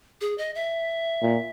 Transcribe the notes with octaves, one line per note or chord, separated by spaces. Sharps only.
G#4
D#5
E5
A#2